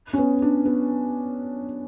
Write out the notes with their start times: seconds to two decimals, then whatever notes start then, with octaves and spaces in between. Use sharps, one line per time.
0.13 C#4
0.18 B3
0.42 D4
0.66 B3